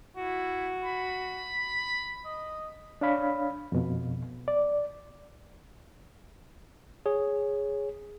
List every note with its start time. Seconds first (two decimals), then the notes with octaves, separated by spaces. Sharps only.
0.17 E4 F#4
0.84 B5
2.25 D#5
3.01 D4 C#5 F5 B5
3.72 F2 B2
4.48 D5
7.06 G#4 C#5